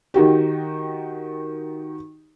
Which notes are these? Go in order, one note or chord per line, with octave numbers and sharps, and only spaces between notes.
D#3 D#4 F#4 G4